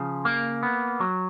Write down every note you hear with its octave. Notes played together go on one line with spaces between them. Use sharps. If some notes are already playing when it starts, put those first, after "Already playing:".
Already playing: C#3 F3
A#3
B3
F#3